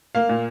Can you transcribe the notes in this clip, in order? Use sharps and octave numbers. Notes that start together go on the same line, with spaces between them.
A#3 F5
A#2